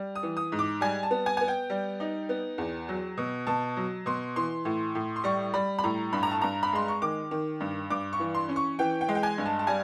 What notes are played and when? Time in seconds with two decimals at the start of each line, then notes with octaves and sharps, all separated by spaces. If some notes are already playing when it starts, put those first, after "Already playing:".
Already playing: G3
0.15 D#6
0.23 E3
0.37 D#6
0.52 G#2
0.59 D6
0.81 G3 G#5
1.03 A5
1.11 B3
1.26 G#5
1.37 B3 G#5
1.48 G5
1.70 G3
2.00 D#4
2.29 B3
2.58 E2
2.89 F#3
3.18 B2
3.47 B2 A5
3.77 F#3
4.06 B2 C6
4.36 E3 C6
4.65 A2
4.95 A2
5.16 C6
5.24 G3 C#6
5.54 G3 B5
5.79 B5
5.84 A2 A#5
6.13 G2 B5
6.23 A#5
6.31 A5
6.42 G2 A#5
6.63 B5
6.73 G#3 C6
6.88 C#6
7.02 D#3 D6
7.31 D#3
7.60 G2
7.90 G2 D6
8.13 C#6
8.20 E3
8.34 C6
8.49 C#4
8.56 C#6
8.79 E3 G5
9.01 G5
9.08 G#3
9.15 G5
9.23 G#5
9.38 G2
9.46 A5
9.59 A5
9.67 G3 G#5